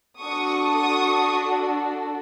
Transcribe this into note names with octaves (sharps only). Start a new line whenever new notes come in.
D4 F#4 A4 C#6 D#6
C#6 D#6